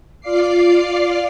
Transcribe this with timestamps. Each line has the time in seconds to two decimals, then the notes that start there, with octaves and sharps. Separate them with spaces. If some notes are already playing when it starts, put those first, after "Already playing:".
0.21 F4 D5 F5 D6 C7